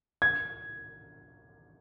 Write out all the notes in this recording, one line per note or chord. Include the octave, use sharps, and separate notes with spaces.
G#6